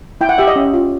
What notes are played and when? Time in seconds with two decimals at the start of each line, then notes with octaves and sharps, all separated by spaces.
0.21 E4 G5
0.29 F#5
0.38 G4 E5
0.48 D#5
0.56 C#4
0.74 F4